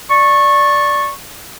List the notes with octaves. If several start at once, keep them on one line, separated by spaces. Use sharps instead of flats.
D5 C#6